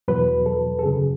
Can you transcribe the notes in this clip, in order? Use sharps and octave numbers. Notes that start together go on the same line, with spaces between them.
E2 B2 F#3 B4
A4
A4
F#2 C#3 F#3 G#4